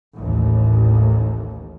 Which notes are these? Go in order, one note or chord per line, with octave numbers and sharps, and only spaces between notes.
A1 D#2